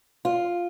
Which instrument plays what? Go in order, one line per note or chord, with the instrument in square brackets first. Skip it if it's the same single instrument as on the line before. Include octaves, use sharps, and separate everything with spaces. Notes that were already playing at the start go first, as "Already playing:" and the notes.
[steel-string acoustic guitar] F4